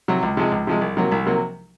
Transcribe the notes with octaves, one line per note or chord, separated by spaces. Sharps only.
C3 F#3
C#2
C3 F3 G#3
C#2
C3 F3 G#3
C2
C3 F#3 A#3
C2
C3 F#3 A#3